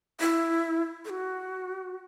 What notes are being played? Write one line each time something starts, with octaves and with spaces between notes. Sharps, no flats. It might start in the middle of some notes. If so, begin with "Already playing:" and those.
E4
A4
F#4